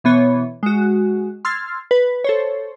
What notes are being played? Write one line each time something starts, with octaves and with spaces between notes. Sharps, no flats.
B2 E3 B3 C#5
G#3 F#4
C6 E6 F6 G#6 A6 C7
B4
A4 C5 C#5